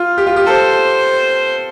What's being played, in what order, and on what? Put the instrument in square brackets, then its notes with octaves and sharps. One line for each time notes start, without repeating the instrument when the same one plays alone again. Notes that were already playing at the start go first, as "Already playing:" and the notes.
Already playing: [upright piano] F4
G4
F4
G4
[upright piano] A4 [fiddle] C5